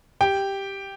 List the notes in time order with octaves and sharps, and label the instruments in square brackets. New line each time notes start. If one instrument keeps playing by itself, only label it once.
[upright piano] G4 G5